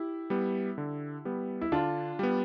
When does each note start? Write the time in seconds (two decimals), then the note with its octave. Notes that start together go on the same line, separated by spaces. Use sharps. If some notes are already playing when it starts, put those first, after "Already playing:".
Already playing: E4 G4
0.30 G3 B3
0.78 D3
1.25 G3 B3
1.61 E4
1.72 D3 D4 F4
2.19 G3 B3